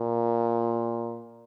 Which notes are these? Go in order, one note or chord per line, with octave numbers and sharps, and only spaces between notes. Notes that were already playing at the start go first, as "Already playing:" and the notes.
Already playing: A#2